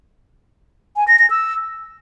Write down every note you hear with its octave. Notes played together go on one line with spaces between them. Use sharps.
G#5
A#6
A#6
E6